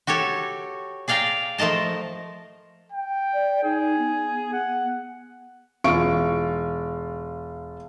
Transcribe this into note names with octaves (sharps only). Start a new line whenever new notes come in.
F#4 G4 A4 C#5
G#4 D5 F5 G5 A#5
F3 A3 A#4 D#5 A5
G5
D5
D#4 G#4
B3
F#5
E1 F4 C#6 D7